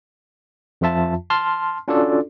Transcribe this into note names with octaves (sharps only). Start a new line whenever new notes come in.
F2 F3 F4 E5 A5
A5 C6 F6
C#4 D4 F4 F#4 A4 D5